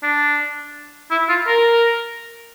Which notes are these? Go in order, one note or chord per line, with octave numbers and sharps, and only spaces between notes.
D4
E4
F4
A#4